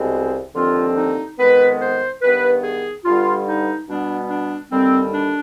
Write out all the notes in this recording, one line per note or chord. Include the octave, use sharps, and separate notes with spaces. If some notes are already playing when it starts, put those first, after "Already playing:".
Already playing: C2 B2 G#3 C4
D#2 D3 F3 C4 F4
D#4
F2 D#3 G#3 B3 B4
C5
G2 D#3 B3 B4
G#4
G2 D3 G3 B3 F4
D#4
B2 G3 B3 D4
D4
D#2 D3 G3 C4
D4